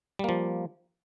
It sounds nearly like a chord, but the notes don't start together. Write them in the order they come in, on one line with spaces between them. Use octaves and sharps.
G3 A#3 F3